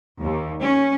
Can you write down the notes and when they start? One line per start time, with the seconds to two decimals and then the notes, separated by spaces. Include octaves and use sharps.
0.21 D#2
0.63 C#4